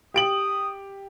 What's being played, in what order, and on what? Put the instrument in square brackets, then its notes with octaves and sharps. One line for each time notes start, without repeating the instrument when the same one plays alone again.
[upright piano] G4 D7 F#7 [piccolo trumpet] D#6